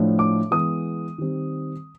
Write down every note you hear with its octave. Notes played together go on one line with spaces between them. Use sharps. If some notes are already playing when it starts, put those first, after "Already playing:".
Already playing: A2 F3 A3 D4
D6
E3 G#3 B3 D#6
D#3 G3 C4